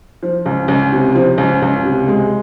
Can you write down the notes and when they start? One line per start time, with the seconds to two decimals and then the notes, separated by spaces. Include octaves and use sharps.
0.23 F3
0.46 C#2
0.68 C#2
0.92 C3
1.15 F3
1.38 C#2
1.62 C#2
1.85 C3
2.08 G#3